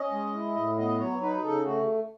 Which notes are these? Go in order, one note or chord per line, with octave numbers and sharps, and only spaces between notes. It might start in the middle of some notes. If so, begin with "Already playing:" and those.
Already playing: C#4 D#5
G#3
E4
A2
B3 D#5
F#3 C#5
D#4 B4
C#3 A4
A3 F#4